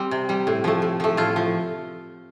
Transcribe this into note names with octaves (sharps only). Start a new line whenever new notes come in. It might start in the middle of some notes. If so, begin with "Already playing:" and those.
Already playing: G3 C4
C3
G3
A2
F3 A3
A2
F3 A3
A2 F4
F3